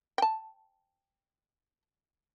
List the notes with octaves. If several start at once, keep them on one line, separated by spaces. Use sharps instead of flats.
G5 A5